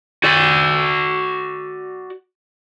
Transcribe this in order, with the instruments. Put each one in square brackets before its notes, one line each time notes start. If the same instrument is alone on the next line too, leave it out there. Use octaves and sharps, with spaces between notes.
[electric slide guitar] F#4 D5